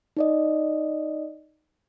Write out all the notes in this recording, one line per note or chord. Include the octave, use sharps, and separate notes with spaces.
D#4 D5 D#5